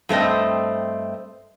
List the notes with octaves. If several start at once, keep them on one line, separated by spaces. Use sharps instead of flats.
G2 A3 C4 D#5